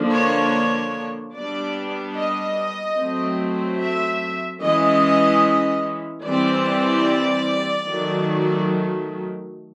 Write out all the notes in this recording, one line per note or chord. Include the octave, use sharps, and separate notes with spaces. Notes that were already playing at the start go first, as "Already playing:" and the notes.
Already playing: D3 F3 A#3 D4
C#5
G3 B3 D4 D5
D#5
F#3 A3 C4
E5
E3 G#3 C#4 D#5
E3 G3 C4 D5
D#3 F#3 A3